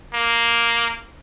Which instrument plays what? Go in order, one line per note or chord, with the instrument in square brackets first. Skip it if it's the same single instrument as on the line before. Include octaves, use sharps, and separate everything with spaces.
[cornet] A#3